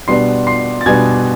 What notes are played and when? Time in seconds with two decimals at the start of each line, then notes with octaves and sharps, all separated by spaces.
0.08 B2 G3 B3 D4 C6 C7
0.47 C6 C7
0.81 A6
0.86 B2 G3 B3 D4 G#5 G#6